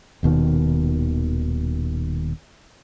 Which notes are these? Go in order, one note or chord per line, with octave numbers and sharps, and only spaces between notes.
D#1 D#2 B2 D#3